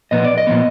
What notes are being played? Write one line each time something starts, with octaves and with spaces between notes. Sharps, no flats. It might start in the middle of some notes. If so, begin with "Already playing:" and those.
A#2 F3 B3 D#5
D5
D#5
A#2 F3 B3